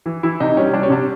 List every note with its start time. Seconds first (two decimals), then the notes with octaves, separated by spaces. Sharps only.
0.06 E3
0.23 E3 E4
0.40 C3 D#4
0.57 G3 C#4
0.73 G3 D4
0.83 C#4
0.90 C3 D4